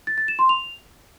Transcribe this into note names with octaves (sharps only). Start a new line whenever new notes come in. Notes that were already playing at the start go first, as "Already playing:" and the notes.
A6
A6
E7
C6
F7